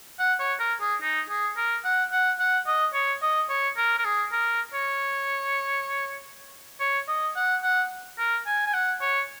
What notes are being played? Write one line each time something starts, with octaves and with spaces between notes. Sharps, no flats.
F#5
C#5
A#4
G#4
D#4
G#4
A#4
F#5
F#5
F#5
D#5
C#5
D#5
C#5
A#4
A#4
G#4
A#4
C#5
C#5
D#5
F#5
F#5
A#4
G#5
G#5
F#5
C#5